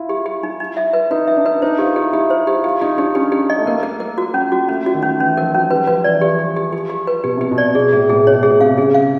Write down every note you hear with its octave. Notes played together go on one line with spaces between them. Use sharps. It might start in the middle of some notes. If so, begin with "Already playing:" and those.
Already playing: E4 F4
G4
G4
D#4
D#4
E5
B4
D#4 B4
E5
D4
B4
D#4 C5
F4 G4
E4 G4
E4 G4
C5
G4
F4 G4
D#4 G4
D4 G4
C#4 G4
G4
D#5
A3
A#3 A#4
A#4
A#4
F#4
C#4
F#4
A3 C#4
F#4
D#3
C#4
E3 C#4
F3 A#4
F#3 C#4
G3 B4
F3 B4
E3 D5
F3 G4
G4
G4
G4
G4
B4
B2 G4
C3 G4
B2
D5
B2 G#4
A2 G#4
A2 G#4
B2 C#5
B2 G#4
C3 F5
C#3 G#4
F5